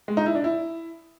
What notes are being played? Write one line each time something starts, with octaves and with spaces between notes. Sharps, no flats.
G#3
D#4
E4
D4
E4